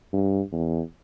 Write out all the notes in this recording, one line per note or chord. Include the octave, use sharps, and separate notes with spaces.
G2
E2